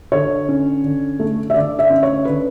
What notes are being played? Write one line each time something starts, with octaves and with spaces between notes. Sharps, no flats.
D3 C#5
C#4
D3
A3
E5
D3 D5
E5
C#4
C#5
D3 B4